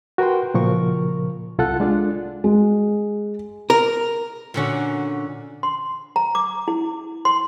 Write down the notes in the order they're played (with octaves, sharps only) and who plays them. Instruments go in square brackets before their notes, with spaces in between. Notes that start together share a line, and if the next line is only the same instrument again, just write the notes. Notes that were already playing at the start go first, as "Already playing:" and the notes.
[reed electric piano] F#4 A#4 B4 G5 C6
A#2 C#3 F3 A#4 C#6
C2 F4 A4 F#5 F#6
G#3 D4 F4
[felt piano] G#3
[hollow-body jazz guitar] A#4
[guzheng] A#2 D3 C#4 F#4
[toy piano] C6
A#5
D6
E4
C6